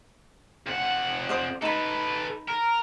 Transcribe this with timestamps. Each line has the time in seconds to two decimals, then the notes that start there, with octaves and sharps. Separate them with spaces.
0.67 F2 F#5
1.29 C5 D5 D#6
1.62 D#4 A4 B4 B5
2.48 A#4